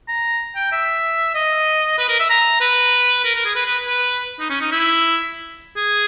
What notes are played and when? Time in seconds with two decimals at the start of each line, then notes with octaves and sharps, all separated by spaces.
0.08 A#5
0.56 G5
0.72 E5
1.35 D#5
1.98 B4
2.09 A#4
2.19 E5
2.30 A#5
2.61 B4
3.25 A#4
3.35 A#4
3.46 G#4
3.55 B4
3.66 B4
3.87 B4
4.40 D#4
4.50 C#4
4.61 D#4
4.72 E4
5.77 G#4